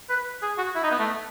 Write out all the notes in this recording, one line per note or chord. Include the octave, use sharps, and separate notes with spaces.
B4
G#4
F#4
E4
D#4
B3
A3